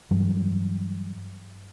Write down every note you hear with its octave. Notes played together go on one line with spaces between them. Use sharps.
G2 E3 F#3 G3